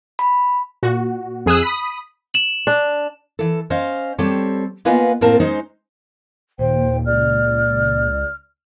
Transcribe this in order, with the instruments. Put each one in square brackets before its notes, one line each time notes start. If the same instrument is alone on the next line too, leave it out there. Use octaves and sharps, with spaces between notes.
[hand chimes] B5
[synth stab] A#2 F#4
F2 G#4 D#6 E6 F#6
B5 D#6
[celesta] E7 F#7
[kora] D4
[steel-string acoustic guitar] E3 A4
C#4 C5 D#5 F5
G3 C4 G4 A4 C#5
A#3 B3 F4 B4 D#5 G#5
A2 A#3 C4 A#4 A5
G#3 C#4 D#4 C5
[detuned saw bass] D#2 [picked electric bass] A#2 [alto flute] C5 [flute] G5
[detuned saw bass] C#2 [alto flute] D5 [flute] F6